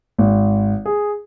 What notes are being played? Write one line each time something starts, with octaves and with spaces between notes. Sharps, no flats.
G#1
G#4